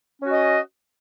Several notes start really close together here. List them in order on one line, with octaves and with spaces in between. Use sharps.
C#4 F#4 D#5